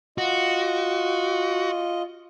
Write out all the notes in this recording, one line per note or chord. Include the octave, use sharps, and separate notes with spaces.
F4 F#4 D#5